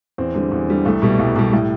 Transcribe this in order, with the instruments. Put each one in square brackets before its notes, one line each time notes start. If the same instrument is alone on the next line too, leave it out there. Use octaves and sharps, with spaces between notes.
[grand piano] E2 C4
D3 G3
E2
D3 G3
C2 A3
B2 G3
C2
B2 G3
A2 G3